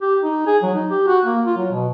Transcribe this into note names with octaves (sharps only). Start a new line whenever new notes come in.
G4
D#4
G#4
F#3
D#4
G4
F#4
A#3
F4
F#3
B2